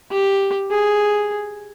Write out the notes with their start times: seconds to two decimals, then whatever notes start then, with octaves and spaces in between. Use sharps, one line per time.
0.11 G4
0.70 G#4